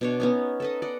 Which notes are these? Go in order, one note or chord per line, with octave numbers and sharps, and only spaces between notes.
B2 D4 C#5
B3 C#4 D#4
A4 B4 D#5
D5 D#5 F#5